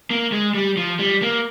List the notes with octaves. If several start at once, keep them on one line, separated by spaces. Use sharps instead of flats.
A#3
G#3
G3
F3
G3
A#3